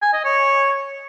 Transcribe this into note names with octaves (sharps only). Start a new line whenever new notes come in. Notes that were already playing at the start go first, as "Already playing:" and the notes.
G#5
D#5
C#5